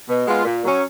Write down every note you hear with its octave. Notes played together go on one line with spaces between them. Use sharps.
B2
G#3 B3 F4
A#2
F#3 C#4